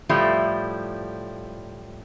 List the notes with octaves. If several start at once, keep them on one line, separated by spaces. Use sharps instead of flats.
A2 F3 G3 E4